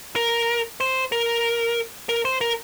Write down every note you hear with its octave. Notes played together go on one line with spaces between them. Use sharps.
A#4
C5
A#4
A#4
C5
A#4